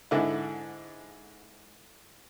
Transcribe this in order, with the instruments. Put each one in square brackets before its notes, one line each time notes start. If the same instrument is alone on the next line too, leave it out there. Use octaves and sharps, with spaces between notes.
[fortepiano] G#2 D3 E4